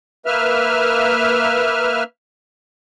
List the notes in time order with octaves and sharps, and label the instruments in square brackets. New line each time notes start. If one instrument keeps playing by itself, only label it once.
[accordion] A#3 B4 E5 F6